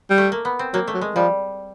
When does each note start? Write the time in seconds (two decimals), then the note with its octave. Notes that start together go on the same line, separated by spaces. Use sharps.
0.10 G3
0.18 A3
0.32 A#3
0.45 B3
0.59 C4
0.74 F#3 A#3
0.88 A3
0.94 F#3
1.01 G#3
1.15 F3 G3